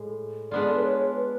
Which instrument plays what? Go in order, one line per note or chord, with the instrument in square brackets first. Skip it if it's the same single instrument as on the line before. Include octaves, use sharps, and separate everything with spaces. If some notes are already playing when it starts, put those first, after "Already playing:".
Already playing: [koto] A2 G#3
[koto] G#3 B3 D4 F4 [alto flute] D5
[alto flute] A4
B4
C#5
B4